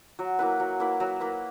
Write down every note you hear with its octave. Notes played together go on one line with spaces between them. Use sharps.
F#3
A#3 E4 B4
F#3
A#3 E4 B4
F#3
A#3 E4 B4